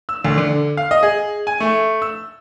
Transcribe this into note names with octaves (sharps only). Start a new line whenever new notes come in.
E6
D2
D3
F5
D#5
G#4
G#5
A3
E6